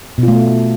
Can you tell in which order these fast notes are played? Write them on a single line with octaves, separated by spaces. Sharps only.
B2 F4 A3